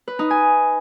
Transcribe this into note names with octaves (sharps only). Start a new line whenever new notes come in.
B4
D#4
G#5